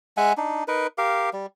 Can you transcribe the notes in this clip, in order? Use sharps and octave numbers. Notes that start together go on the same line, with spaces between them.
G#3 E5 F#5 G#5
D4 D#4
D#4 A#4 B4
G4 A#4 F5
G3